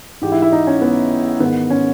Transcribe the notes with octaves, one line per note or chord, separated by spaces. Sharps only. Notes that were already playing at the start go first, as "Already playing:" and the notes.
G#2 E3 G4
E4
E4
D#4
C#4
B3
G#2 D#3 B3
C#4